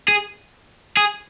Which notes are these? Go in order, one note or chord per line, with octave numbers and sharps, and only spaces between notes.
G#4
G#4